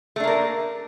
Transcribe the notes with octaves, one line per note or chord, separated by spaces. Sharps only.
A3 A#3 D4 A#4